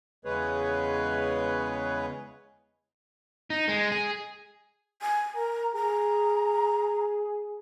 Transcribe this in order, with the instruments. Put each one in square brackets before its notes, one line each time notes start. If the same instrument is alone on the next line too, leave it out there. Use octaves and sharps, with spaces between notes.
[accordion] E2 C#3 G#3 G#4 B4 C#5
[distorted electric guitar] D#4
G#3
G#4
[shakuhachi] G#5
[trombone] A#4 [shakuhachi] A#5
[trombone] G#4 [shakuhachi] A#5